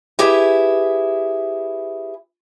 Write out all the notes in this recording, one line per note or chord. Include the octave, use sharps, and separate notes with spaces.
E4 G4 G#4 B4